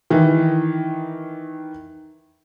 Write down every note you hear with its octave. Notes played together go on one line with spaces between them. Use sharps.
D#3 E3